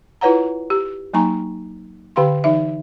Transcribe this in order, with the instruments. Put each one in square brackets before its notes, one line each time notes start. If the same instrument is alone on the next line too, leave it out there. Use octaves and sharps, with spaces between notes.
[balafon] E4 F4 B4 C#5 F#5 A#5
G4
F#3 A#3 D#4 G#5 A#5 C#6
D3 G4 F5 G5 C6
E3 D#4 E5